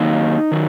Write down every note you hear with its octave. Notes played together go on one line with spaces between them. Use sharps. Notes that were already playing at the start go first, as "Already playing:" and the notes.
Already playing: D#3 F#3 A#3 D#4 D#5
D#3 F#3